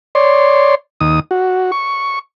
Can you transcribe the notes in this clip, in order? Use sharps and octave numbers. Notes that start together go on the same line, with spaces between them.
C#5 D5 C6
D#2 D#6
F#4
C#6